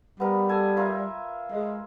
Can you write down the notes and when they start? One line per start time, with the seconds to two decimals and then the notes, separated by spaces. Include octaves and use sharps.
0.20 G3 B3 A#4
0.49 A4 G#5 D#6
0.77 F4 A#4 E5
1.51 G#3